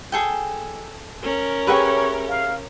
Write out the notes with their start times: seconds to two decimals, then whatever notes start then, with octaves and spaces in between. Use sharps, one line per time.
0.12 G#4 A4 G5
1.23 C#4 A#4
1.67 G4 G#4 B4 C#5 E5 F#5 G5
2.29 F5